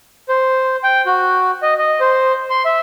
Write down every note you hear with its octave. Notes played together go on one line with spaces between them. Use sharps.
C5
G5
F#4
D#5
D#5
C5
C6
E5